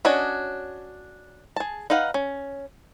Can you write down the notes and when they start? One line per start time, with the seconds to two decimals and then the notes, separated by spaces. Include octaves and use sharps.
0.05 C#4 D4 F#4 C#5 D#5
1.56 G#4 A5
1.90 D#4 B4 F5 F#5
2.14 C#4